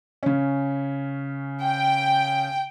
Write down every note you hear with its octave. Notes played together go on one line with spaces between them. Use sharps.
C#3 C#4
G5